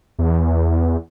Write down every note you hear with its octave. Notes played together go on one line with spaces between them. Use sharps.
E2